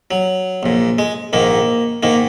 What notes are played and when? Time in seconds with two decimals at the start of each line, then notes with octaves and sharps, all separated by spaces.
0.11 F#3
0.63 A#1 A#2
0.98 G#3
1.33 A#1 G#2 D#3 A#3
2.03 G#2 D#3 A#3